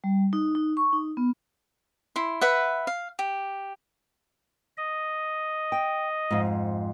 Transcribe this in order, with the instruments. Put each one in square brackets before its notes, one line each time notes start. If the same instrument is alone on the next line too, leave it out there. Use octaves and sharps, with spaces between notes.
[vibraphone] G3
D#4
D#4
C#6
D#4
B3
[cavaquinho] E4 C6
B4 E5 F#5
F5
G4
[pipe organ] D#5
[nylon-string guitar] G5
F2 G#2